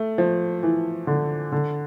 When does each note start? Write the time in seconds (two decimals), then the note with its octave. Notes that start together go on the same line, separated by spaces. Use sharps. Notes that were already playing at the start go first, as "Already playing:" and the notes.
Already playing: A3
0.18 F3
0.63 E3
1.07 D3
1.52 D3